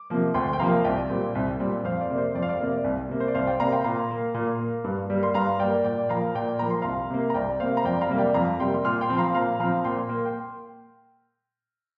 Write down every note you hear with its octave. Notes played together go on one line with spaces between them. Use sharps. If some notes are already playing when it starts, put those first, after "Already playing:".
Already playing: D6
C3 F3 A#3
D2 G5 C6
G5
C3 F3 A#3 F5 A#5
C2 D5 G5
A#2 G3 C4
C2
A#2 G3 C4
F2 C5 F5
D5
C3 A#3
C5
F2 D5
F5
D5
F5
C3 A#3 D5
C2
C3 A#3
C5
D5
C2 C5 F5
D5 G5
C3 A#3 F5 A#5
G5 C6
A#2 F5 A#5
A#3
A#2
A#3
G2
G3 A#3
C6
G2 F5 A#5
G3 A#3 D5 G5
A#2 D5 G5
F3 A#3 F5 A#5
A#2 D5 G5
F3 A#3 A#5
C6
C2 F5 A#5
C3 A#3
A#5
C2 D5 G5
C3 A#3 C5 F5
A#5
F2 D5 G5
F5 A#5
C3 G3 A#3
D5 G5
F2 F5 A#5
C3 G3 A#3 G5 C6
A#2 C6 F6
G5 C6
F3 C4
F5 A#5
A#2 F5 A#5
F3 C4 F5 A#5
A#2 G5 C6
A#3
G5